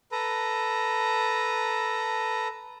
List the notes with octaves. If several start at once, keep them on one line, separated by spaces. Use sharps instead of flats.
A4 B4 A#5